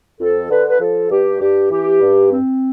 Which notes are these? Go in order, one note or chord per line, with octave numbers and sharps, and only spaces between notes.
F2 A4
D3 B4
B4
F3 A4
G2 G4
G2 G4
E3 G4
G2
C4